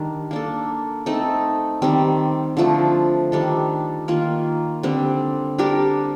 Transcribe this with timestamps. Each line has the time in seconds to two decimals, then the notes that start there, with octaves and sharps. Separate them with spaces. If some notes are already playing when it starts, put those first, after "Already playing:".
Already playing: D#3 G3 D4
0.31 A#3 D4 A4
1.06 A3 C4 D#4 A4
1.82 D#3 G3 C4
2.57 D3 F3 A3
3.32 D#3 G3 D4 A4
4.08 D#3 A#3 F4
4.83 D3 G3 C4
5.58 G3 D4 G4 A#4